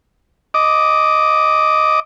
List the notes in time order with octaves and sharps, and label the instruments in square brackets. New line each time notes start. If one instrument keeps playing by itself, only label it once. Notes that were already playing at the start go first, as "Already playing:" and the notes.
[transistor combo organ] D#5 D6